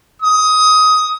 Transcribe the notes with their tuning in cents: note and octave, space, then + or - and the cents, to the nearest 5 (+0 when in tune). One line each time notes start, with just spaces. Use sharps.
D#6 +15